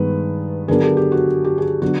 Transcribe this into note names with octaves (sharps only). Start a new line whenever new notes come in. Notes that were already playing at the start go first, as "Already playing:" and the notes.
Already playing: G2 D#3 G#3 B3 B4
D3 F#3 B3 D4 G#4 A#4
G4 A4
G4
F#4
G4
G#4
G4
D3 F#3 B3 D4 F#4